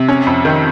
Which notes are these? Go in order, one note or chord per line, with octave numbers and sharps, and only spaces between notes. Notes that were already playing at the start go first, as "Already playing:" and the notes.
Already playing: C3
C#4
F2
D#3